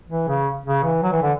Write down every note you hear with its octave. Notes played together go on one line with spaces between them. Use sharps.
E3
C#3
C#3
E3
F#3
E3
D3